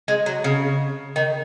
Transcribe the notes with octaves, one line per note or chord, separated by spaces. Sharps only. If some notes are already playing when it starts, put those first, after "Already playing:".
G#3
F#3
C#3
D#3